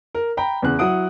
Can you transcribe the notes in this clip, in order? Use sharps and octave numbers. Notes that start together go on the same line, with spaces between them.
A#4
G5 A#5 B5
E2 C#3 F#6
F#3 E4 F#5 D#6 D7